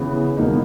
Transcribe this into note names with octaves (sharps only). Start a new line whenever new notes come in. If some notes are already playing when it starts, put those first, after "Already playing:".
Already playing: C#3 E3 B3
E2 B2 A#3 D#4